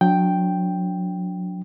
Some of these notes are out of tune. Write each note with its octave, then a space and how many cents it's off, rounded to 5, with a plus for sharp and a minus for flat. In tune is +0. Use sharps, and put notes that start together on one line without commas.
F#3 -30 D4 -15 G5 +0